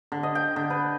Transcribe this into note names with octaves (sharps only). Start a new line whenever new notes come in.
D3
D#5
G5
D3
B4